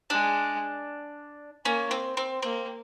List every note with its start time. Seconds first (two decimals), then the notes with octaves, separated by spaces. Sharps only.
0.10 G#3 D4
1.65 A#3 C#4
1.91 C4
2.17 C4
2.42 A#3 C4